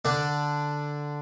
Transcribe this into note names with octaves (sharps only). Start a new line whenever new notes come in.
D3 D4